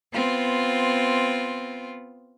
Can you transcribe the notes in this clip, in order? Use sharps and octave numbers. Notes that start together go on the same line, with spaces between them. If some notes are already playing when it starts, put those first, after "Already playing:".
B3 C4 F4